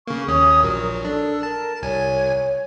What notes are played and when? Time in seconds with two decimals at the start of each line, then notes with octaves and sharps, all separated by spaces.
0.07 C#3 A#3 C#6
0.28 D#2 C#4 D#6
0.63 A#1 F#3 A#4
1.05 D4 A4
1.43 A#4 A5
1.82 C2 C#5 G#5